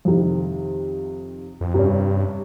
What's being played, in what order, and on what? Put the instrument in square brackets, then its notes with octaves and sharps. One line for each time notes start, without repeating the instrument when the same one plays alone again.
[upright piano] F2 C3 D#3
[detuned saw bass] F2
[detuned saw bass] G2 [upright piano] C3 G3 C#4